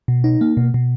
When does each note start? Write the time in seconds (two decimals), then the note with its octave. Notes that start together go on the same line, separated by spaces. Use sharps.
0.08 B2
0.24 D#4
0.41 A#3
0.57 B2
0.74 B2